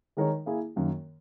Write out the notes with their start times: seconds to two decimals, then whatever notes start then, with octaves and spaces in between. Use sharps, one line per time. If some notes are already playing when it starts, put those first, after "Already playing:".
0.17 D#3 G#3 D#4 A#4 C#5
0.46 A#3 E4 G#4
0.76 F#2 D#3 A#3